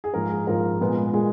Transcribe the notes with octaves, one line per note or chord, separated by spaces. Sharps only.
G#4
G#2 F3 A#3 A#4
G#4
G#2 F3 A#3 A#4
A#2 G#3 B3
A#2 G#3 B3 G#4